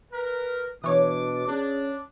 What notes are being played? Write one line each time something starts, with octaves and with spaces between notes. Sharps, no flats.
A#4 B4
B2 E3 D4 C#5 D6
C#4 D4 G#4